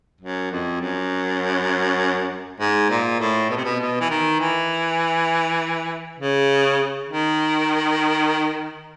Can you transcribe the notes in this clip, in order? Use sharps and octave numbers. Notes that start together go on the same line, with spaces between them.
F#2
F2
F#2
G#2
A#2
A2
B2
C3
B2
B2
E3
D#3
E3
C#3
D#3